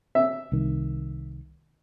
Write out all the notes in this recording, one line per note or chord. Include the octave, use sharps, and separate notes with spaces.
E5
C2 D#3